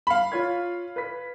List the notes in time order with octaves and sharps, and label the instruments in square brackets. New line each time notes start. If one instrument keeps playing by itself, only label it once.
[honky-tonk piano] F5 B5
[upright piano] F4 C#5 G#6
B4 B6